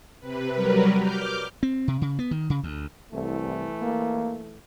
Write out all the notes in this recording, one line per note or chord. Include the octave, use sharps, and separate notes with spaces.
C3 B4
F#3 G3 A#4 B4
D6 F6 G6
C4
C3
C#3
B3
D#3
C#3
D2
C2 E3 A3
A#3